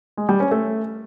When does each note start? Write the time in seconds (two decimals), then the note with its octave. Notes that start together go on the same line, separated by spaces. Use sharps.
0.17 G#3
0.29 G3
0.40 C#4
0.51 A3